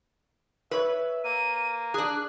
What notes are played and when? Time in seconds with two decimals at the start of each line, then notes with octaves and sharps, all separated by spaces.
0.71 B4 C#5 E5
1.24 A#3 D#7
1.94 D4 G#4 F#6